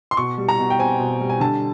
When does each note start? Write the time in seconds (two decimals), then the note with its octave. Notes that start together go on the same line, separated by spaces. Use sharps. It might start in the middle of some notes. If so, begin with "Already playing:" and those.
0.11 C6
0.17 B2 C#6
0.38 G3
0.49 A#5
0.59 B2
0.70 G5
0.79 C4 G#5
0.99 B2
1.21 G3
1.30 G#5
1.40 D3 A5